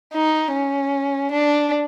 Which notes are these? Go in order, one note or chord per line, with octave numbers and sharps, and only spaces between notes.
D#4
C#4
D4